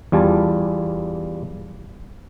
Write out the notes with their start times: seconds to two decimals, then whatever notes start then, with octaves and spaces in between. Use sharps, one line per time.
0.12 E2 G3 F4 G#5 A5